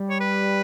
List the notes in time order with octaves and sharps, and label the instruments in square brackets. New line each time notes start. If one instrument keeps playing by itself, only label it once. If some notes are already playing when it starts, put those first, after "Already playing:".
Already playing: [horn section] G3
[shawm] C#5
B4